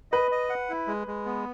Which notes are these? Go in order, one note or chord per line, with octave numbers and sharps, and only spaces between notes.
B4 D#5
D#5
F#5
E4
G#3
G#3
B3